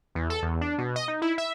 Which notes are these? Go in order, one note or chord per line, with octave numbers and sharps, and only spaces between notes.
E2
A4
E2
D4
B2
D#5
D#4
E4
E5